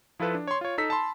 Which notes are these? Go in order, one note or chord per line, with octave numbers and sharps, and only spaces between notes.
F3 E4 F4 A4 B4
D4
C#5 C6
F4 C#5
D#4 A4 E6 B6
A5 B5 C6